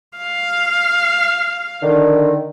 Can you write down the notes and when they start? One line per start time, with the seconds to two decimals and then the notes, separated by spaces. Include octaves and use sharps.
0.18 F5
1.83 D3 D#3